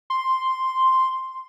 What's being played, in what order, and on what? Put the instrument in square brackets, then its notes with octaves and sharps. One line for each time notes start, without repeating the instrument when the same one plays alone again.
[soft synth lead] C6